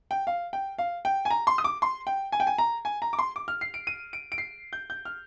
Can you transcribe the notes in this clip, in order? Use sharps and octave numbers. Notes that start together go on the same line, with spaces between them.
G5
F5
G5
F5
G5
G#5
A#5
C6
D#6
D6
C6
G5
G#5
G5
G#5
A#5
G#5
A#5
D6
C6
D6
F6
C7
D7
D#7
D7
D7
C7
G6
G6
F6